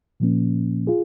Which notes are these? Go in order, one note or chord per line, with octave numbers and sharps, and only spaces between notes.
A#2 F3 A#3 C#4
F4 G#4